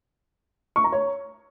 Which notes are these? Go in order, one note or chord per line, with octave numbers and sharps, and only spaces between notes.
C#6
A#5
C#5